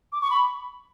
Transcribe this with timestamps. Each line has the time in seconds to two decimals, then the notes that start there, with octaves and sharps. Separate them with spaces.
0.12 D6
0.21 C#6
0.31 B5